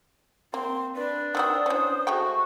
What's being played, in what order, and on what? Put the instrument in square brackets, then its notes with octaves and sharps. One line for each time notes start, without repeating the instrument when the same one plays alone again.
[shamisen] A#3 [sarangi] C4 [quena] C6
[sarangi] D4 [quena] B4
[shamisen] D#3 C4 F#4 [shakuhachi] D#6 [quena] E6
[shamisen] E3 C#4 [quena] C5
[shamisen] G#3 A3 G5 [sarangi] F#4 [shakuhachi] C#6